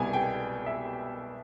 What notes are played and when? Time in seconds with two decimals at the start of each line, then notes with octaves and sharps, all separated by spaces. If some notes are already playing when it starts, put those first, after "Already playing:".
Already playing: C2 B2 G3 G#5
0.13 G5
0.66 E5